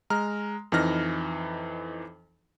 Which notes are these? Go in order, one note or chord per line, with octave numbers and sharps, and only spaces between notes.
G#3 A#5 F6
F2 E3 D#4 F6 A#6